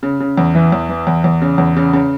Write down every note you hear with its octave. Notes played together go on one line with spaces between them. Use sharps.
C#3
C#3
E2
E3
E2
E3
E2
E2
C#3
E2
C#3
C#3